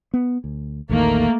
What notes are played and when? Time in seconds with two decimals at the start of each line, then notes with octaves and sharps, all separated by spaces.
0.14 B3
0.44 D2
0.89 A#1 E2 D#3 A3 A#3